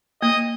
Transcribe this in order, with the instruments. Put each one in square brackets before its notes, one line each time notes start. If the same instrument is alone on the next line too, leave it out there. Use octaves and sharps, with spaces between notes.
[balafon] A#3 [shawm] D#5